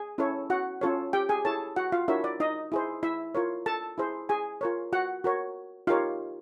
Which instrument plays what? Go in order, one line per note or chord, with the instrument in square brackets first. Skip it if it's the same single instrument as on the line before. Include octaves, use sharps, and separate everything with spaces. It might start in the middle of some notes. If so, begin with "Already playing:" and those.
Already playing: [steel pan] G#4 G#5
C#4 E4 A4 C#5
F#4 F#5
C#4 F4 A4 C#5
G4 G5
G#4 G#5
E4 G#4 A4 C#5 A5
F#4 F#5
F4 F5
D4 E4 F#4 A#4 C#5 E5
D5
D#4 D#5
E4 G#4 C5
E4 E5
F4 A#4 C#5
A4 A5
E4 G#4 C5
G#4 G#5
F4 A#4 C#5
F#4 F#5
F#4 A#4 C#5
D#4 F4 G4 A#4 C#5 F5